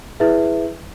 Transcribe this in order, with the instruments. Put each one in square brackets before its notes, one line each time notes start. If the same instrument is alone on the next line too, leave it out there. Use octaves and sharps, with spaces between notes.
[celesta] E4 G#4 B4 E5